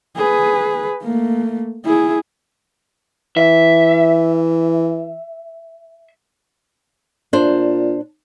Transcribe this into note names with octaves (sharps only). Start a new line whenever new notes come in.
G#4 B4
A3 A#3
E4 G#4
E3 E5
A#2 D4 C5